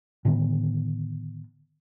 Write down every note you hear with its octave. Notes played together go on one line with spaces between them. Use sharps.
A2 D3 D#3 B3